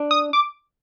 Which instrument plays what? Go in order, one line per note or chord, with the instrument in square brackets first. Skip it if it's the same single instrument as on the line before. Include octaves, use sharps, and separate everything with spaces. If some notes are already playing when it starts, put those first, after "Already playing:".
Already playing: [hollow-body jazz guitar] D4
[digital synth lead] D#6
D6